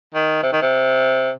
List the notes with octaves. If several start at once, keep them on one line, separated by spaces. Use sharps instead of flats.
D#3
C3
D#3
C3